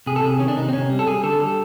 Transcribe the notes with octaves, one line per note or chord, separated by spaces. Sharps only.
C3 G#4
A4
C3 G#4
D#3 C#4
D4
C3 D#4
C4
C3 C#4
G3
A4
G3 G#4
D3 A4
G3 A4